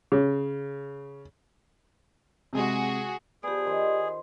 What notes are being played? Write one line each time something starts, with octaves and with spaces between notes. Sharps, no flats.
C#3
C3 G#3 F#4 G#4
F3 B3 G4 G#4 D5
D#3 C5 G#5